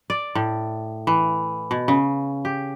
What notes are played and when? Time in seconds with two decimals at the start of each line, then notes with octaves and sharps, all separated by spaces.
0.10 D5
0.35 A2
1.07 E3
1.71 B2
1.88 C#3
2.45 G4